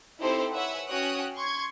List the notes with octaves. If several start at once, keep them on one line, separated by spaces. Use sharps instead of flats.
C4 D#4 E4 G4 A4 C5
B4 C#5 E5 F#5 G#5
C#4 F#4 C#5 G5 D#6 F#6
C6 C#6 G#6